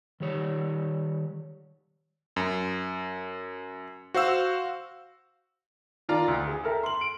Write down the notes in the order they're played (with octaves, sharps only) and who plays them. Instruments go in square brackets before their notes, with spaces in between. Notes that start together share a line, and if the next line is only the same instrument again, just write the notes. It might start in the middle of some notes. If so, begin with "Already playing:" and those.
[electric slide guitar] D#3 G3 C#5
[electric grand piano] F#2
F#4 C5 F5 E6
[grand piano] D#3 F4 D5 A#5
D2
G#4
A4 A#4 E5 G5
C6 F#7
D7